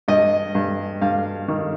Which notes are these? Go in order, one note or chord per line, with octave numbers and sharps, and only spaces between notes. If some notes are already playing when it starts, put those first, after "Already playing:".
G2 D#5
G2
G2 F5
D#3